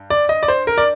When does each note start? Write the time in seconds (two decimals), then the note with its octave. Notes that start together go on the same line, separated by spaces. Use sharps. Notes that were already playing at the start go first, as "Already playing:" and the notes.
Already playing: G2
0.10 D5
0.29 D#5
0.43 D5
0.48 C5
0.67 A#4
0.78 D5